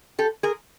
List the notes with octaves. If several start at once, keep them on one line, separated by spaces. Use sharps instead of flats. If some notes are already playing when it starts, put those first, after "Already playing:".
G4 A4
G#4 A#4